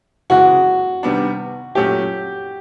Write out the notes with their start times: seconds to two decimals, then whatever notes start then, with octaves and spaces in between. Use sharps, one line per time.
0.30 C#3 E3 G#3 F#4
1.03 C3 D#3 G3 B3 D4
1.75 A#2 F#3 A3 C#4 G4